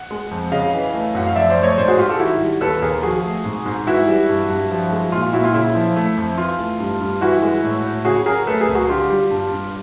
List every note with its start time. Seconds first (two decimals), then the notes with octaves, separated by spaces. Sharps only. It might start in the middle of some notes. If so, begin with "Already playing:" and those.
Already playing: F#5
0.11 G#3
0.31 F2
0.52 C#3 D#5 F5
0.73 E3
0.94 A3
1.15 F#2 F#5
1.26 F5
1.36 F3 D5 E5
1.50 C5 D5
1.57 A3
1.63 C#5 D#5
1.78 G#2 C5 D5
1.88 F#4 G#4
1.98 G#2 F4 G4
2.09 G4 A4
2.19 D#3 E4 F#4
2.40 G3
2.61 D#2 A4 B4
2.82 D#2 G#4 A#4
3.03 F3 F#4 G#4
3.24 A3
3.45 G#2
3.66 G#2
3.87 E3 E4 F#4
4.08 G3
4.29 G2
4.50 G2
4.71 F3
4.91 G#3
5.12 A#2 F4
5.33 A#2 E4 F#4
5.44 F4
5.54 C#3 E4
5.75 F3
5.96 A3
6.17 F2
6.38 E3 F4
6.59 A3
6.80 G2
7.01 G2
7.21 E3 E4 F#4
7.42 G#3
7.63 A2
7.84 A2
8.05 C#3 F#4 G#4
8.26 F#3 G#4 A#4
8.47 A3 A4 B4
8.61 G#4 A#4
8.68 C#2
8.75 F#4 G#4
8.89 D3 F4 G4
9.10 G3
9.31 G2
9.52 G2